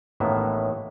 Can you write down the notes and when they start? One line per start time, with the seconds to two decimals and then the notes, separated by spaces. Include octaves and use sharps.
0.20 A1 A2 D#3 A#3 B3 E5